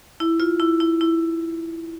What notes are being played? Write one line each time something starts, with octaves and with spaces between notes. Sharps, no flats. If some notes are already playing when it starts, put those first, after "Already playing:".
E4
F4
E4
E4
E4